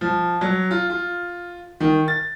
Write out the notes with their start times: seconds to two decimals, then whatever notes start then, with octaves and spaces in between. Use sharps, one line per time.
0.01 F3
0.41 F#3
0.71 F4
0.90 F4
1.80 D#3
2.08 A6